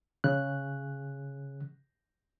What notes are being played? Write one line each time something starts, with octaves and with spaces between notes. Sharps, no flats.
C#3 F#6